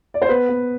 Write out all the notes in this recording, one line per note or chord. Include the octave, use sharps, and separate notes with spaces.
D5
C5
B3 B4
B3